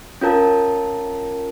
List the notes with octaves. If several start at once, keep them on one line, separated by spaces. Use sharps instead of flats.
C#4 F4 A#4 A5